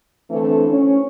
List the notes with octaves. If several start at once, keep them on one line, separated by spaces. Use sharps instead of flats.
D3 E3 A3 C4 D4
C#4